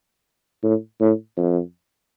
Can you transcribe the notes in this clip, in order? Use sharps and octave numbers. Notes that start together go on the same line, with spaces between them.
A2
A2
F2